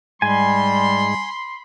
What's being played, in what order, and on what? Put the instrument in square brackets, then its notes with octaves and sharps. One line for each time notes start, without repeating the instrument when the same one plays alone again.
[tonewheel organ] G#2 G#3 [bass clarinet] G3 [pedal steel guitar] G#5 [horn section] B5 C6